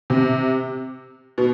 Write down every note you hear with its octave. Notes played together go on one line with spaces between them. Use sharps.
C3
B2